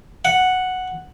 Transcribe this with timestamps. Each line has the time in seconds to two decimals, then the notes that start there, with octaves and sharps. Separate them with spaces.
0.25 F#5